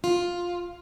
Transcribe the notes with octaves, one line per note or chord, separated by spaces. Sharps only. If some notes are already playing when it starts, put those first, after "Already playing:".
F4